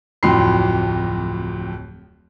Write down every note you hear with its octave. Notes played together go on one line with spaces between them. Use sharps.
D1 F2 A2 F#3 C6 C7